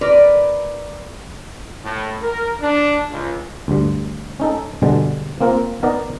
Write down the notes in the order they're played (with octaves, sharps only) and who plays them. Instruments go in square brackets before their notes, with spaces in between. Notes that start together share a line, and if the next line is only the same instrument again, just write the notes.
[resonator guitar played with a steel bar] A#4 B4 D5
[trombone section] A2
A#4
D4
C#2
[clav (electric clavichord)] D2 G2
C#4 D#4 A4
G2 B2 D3 G3 G#3
A#3 C4 F4 A#4
B3 D#4 A#4 B4 D5 D#5